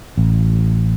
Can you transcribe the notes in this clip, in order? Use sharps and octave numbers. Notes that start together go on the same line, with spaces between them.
A1